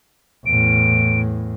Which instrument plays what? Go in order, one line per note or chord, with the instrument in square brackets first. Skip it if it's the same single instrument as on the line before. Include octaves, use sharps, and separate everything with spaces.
[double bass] E2 A2 [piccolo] D7